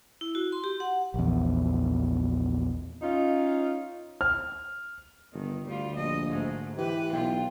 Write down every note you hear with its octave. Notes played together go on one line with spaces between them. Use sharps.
E4
F#4
C6
G4
F#5
A#1 E2
C#4 D#4 F4
F6
G1 D#3
D2 G3 F4
A#1 D#5
G#2 A3
E3 G4 B4
B1 F4 G5